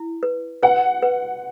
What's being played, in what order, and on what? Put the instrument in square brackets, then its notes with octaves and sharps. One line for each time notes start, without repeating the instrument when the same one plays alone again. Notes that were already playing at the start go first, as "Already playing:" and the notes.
Already playing: [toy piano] E4
B4
[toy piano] B4 [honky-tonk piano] F#5
[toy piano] B4